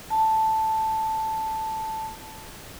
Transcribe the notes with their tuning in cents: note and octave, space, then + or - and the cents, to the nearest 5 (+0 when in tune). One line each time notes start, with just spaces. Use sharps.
A5 +0